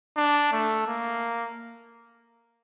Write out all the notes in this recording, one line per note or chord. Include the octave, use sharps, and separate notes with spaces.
D4
A3
A#3